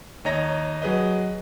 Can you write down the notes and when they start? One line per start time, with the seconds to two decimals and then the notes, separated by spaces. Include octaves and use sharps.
0.25 D#2 C#5 D#5 A#5 A#6
0.82 F#3 G#4 B4 D#5